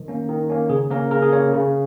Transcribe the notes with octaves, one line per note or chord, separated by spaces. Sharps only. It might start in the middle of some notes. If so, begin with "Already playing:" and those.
Already playing: D#3
A#3 C#4
D#3
A#3 C#4
C#3 G#4
A#3 C#4 A#4
C#3 A#4
G#4
A#3 C#4 C#5
C#3